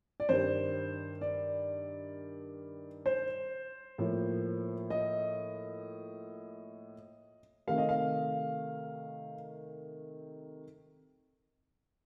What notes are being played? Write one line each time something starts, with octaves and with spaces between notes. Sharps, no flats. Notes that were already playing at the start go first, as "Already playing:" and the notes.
D5
G2 D#3 G3 C5
D5
C5
A2 F3 A#3
D#5
C3 D#3 A3 F5
D#5
F5